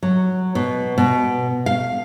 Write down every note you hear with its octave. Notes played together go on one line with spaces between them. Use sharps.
F#3
B2
B2
F5